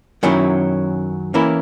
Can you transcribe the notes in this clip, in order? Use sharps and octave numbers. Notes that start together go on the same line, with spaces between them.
F#2 D#3 F#3 C#4 E4
E3 A#3 C#4 E4 A#4